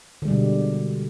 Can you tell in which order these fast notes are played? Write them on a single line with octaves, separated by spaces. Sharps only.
D3 G#3 G3 B2